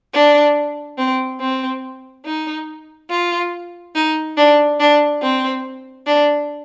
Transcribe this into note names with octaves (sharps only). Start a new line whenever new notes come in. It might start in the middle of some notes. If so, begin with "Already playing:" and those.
D4
C4
C4
D#4
F4
D#4
D4
D4
C4
D4